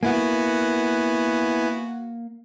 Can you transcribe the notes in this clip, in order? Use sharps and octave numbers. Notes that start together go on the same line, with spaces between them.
A#3 B3 E4 F#4 G#5